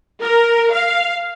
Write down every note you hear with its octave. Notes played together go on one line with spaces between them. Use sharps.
A#4
F5